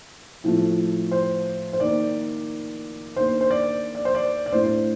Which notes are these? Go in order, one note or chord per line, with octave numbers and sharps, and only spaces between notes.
A2 F3 A3
C5
C5
D#3 A#3 D#4 D5
D#3 A#3 D4 C5
C5
D5
D5
C5
D5
D5
A2 A3 D4 C5